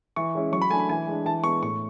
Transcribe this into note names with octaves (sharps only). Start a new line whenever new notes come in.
E3 C#6
G#3 C#4 E4
F#3 C#6
B5
A3 D4 G#5
B5
E3 G#5
G#3 D4
E3 A5
G#3 B3 C#6
A2 C#6